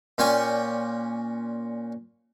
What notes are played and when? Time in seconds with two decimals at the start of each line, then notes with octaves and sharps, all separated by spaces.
0.18 A#2 C#4 D5 G5 G#5 C#6